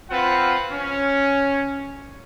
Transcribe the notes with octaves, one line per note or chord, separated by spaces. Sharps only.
C4 F4 B4 F#5
C#4